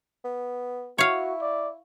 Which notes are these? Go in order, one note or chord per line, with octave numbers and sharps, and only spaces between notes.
B3
E4 F#4 C#5 F5
D5